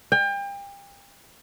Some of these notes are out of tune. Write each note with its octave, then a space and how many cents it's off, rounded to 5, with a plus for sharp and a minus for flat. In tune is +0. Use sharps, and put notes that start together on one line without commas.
G5 +35